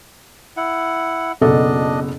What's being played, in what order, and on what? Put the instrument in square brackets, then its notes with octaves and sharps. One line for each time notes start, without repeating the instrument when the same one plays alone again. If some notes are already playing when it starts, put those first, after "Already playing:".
[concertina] E4 F#5
[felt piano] F#1 B2 A4 [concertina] D4 D#5